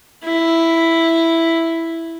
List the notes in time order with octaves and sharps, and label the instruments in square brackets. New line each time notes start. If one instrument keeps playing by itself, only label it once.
[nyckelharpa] E4